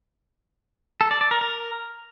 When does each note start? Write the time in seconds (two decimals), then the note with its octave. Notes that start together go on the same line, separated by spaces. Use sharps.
1.01 A4
1.11 D5
1.21 D5
1.31 A#4
1.41 A#4